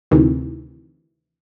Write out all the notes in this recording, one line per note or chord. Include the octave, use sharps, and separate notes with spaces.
D2 C3 D#3 E3